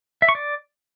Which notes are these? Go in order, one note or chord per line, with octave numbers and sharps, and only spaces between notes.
E5
C#6
D5